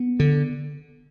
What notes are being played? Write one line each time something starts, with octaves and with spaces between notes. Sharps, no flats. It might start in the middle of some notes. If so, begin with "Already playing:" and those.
Already playing: B3
D3